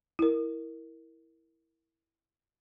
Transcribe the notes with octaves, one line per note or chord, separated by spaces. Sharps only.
E4 A#4